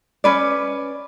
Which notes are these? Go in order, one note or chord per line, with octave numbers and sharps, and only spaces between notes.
C#4 B4 D5